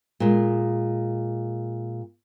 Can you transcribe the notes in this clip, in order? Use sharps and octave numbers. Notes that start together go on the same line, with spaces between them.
A#2 G#3